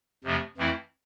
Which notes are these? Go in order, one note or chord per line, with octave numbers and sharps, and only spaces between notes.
F2 C3 F3 A3
F2 E3 A3 C4 E4